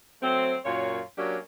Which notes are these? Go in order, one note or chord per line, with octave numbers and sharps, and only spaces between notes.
F#3 A3 C4
F#2 A#2 F4 C#5
F#3 A#3 C#4 D4 G4